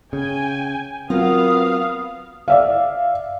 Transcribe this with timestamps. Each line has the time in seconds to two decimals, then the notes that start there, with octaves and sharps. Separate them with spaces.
0.13 C#3 G5 G#5
1.10 F#3 B3 C4 F4 A#4 F5 F#5 D#6
2.48 D5 E5 F5